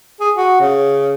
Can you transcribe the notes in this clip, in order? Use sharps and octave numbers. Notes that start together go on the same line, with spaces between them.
G#4
F#4
C#3